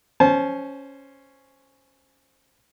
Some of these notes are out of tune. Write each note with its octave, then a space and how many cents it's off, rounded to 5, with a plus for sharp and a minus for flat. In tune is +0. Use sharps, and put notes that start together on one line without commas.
C#4 +0 C5 +0 A5 -35